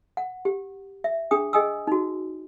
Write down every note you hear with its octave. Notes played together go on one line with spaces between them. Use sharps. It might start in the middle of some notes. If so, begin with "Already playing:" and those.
F#5
G4
E5
D4 G#4 G5 D#6
G#4 D#5 G5 G#5 D#6 E6
D#4 F#4